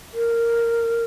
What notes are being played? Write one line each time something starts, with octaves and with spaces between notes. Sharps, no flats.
A#4